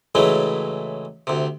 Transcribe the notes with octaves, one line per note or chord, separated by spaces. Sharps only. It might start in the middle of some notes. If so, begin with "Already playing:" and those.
A2 C#3 E3 F#3 G#3 A3
D2 C3